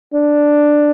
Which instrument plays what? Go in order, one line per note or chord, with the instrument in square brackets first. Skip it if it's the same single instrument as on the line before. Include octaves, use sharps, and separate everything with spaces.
[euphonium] D4